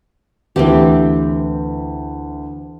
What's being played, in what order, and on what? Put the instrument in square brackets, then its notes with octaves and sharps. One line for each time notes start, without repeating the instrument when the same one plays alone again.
[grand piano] D2 [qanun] E3 C4 G4